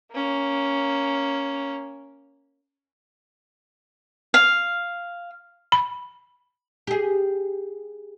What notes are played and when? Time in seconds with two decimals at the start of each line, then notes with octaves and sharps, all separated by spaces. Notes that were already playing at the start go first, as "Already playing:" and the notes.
0.12 A#3 C#4
4.34 F5
5.72 B5
6.87 G4 G#4